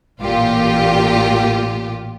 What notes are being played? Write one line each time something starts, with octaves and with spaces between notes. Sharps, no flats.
A1 A#2 F4 G4